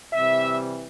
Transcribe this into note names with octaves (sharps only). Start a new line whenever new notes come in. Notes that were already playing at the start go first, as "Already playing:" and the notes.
C3 E3 G3 E5